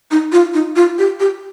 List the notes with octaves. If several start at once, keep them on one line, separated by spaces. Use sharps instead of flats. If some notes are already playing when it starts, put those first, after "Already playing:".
D#4
F4
D#4
F4
G4
G4